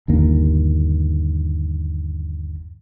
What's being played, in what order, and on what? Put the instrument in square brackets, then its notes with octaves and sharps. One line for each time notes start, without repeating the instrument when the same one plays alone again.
[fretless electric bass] G1 D#2 A#3